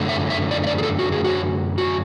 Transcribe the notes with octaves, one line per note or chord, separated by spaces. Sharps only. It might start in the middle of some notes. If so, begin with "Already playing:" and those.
Already playing: F#2 D3 A3
E5
E5
D5
E5
D5
G#4
A4
F#4
G#4
F#4
F#4